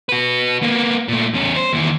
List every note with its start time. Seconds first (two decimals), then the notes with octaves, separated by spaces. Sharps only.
0.09 F#4 B4
0.62 A#3 B3
1.08 A#2 A3
1.33 E2 C#4
1.56 C5
1.73 D#2 E3